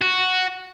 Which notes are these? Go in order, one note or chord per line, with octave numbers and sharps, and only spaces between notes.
F#4